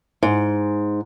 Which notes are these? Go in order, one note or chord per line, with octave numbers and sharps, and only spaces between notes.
G#2